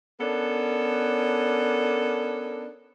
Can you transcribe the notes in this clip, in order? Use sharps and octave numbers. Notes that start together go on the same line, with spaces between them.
B3 C#4 D4 A4 A#4